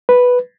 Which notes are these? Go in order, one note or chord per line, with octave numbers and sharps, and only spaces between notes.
B4